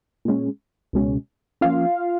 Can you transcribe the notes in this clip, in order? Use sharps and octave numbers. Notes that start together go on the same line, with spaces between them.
A#2 G#3 C#4
C#2 B2 G#3 C#4
F3 A#3 C#4 F4 F5